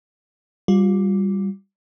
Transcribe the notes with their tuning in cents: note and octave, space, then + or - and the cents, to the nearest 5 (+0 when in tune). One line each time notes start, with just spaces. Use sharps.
G3 +0 F4 +25